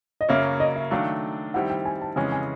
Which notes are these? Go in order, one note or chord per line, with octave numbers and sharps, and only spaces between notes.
D#5
F#2 C#3 F#3 A#3 C#4 E5
D#5
E5
D#3 F#3 A3 D4 F5
D#3 G3 C4 E4 F#5
G5
G#5
A5
F2 C#3 E3 G#3 C#4 G#5
G#5